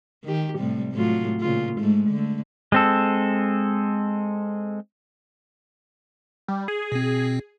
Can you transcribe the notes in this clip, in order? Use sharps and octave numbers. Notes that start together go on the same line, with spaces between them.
D#3 G4
A2 C3 G3
A2 F#3 F4
A#2 C#3 F4
G#2 G#3 A3
D3 A3
G#3 C4 A4
G3
G#4
B2 C4